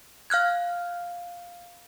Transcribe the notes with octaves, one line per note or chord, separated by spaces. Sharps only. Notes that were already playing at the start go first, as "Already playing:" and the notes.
F5 F6 F#6 G#6